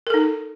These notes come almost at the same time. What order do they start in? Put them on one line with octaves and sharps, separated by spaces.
A#4 A4 D#4